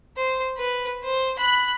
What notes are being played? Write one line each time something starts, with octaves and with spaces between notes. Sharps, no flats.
C5
B4
C5
B5 F#6